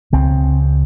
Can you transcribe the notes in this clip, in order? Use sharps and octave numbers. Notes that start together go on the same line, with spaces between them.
C#2 C#3 C4